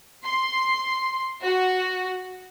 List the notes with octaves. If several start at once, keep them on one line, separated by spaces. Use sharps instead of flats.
C6
F#4